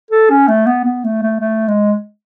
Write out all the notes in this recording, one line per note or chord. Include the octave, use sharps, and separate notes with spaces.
A4
C#4
A3
B3
B3
A3
A3
A3
G#3